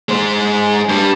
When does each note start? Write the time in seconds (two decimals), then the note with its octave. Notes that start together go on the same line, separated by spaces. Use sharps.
0.09 G#3 C5
0.89 G2 G3